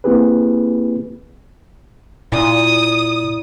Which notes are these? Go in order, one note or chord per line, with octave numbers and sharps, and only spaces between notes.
A#3 C4 E4 G4 G#4 B4
A#2 E4 D5 D#6